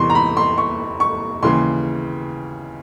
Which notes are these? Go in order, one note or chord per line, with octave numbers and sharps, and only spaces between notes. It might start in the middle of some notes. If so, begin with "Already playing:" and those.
Already playing: E2 C3 E3 C6 C#6
A#5
B5
C6
C#6
C#6
D#2 C#3 E3 C6